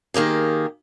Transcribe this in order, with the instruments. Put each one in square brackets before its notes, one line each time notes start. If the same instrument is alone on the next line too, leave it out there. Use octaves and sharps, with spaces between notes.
[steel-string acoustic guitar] D#3 A#3 G4 G#4